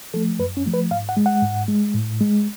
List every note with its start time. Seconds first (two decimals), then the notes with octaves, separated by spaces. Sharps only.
0.14 F3 A3 A4
0.39 F#2 B4
0.57 C#4
0.66 F3 A3
0.74 B4
0.91 G#2 F5
1.09 F#5
1.17 G#3
1.26 F#5
1.43 G#2
1.68 G#3
1.94 A2
2.20 G#3